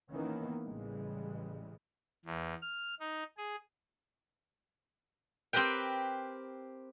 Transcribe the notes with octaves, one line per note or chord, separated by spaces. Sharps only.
D#3 E3 A#3 B3 C#4
A1 C#3 E3 G3 G#3
E2
F6
D#4
G#4
C4 G4 A#4 B4 G5